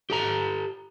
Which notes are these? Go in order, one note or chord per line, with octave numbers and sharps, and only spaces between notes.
G4 A4 A#5